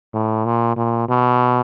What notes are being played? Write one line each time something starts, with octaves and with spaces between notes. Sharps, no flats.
A2
A#2
A#2
B2